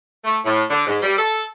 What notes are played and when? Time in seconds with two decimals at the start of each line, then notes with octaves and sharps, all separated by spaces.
0.24 A3
0.44 A2
0.70 D3
0.86 G#2
1.02 G3
1.17 A4